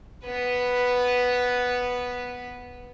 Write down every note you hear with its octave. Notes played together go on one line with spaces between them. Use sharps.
B3 B4